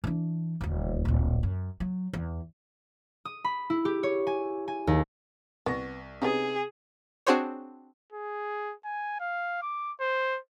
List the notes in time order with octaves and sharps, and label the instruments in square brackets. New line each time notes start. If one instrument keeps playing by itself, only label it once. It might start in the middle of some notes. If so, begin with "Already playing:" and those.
[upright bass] E3 D4
D#1 D2
D1 A#1
F#2
F#3
E2
[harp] D#6
B5
E4
G4
C#5
G#5
G#5
D#2
[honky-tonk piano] C2 C#6 A#6 [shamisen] B3
[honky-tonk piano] C3 [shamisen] B3 C#4 D#4 [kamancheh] G#4
[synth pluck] C4 D4 F#4 G#4 C5 C#5
[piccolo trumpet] G#4
G#5
F5
D6
C5